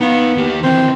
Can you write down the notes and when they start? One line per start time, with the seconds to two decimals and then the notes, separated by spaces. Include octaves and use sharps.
0.01 B3 D#4 F5
0.37 D#2 G4
0.63 D#3 E3 C4